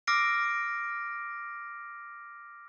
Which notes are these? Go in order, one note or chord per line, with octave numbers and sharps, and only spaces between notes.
D6 E6 F6 A#6 C7 D7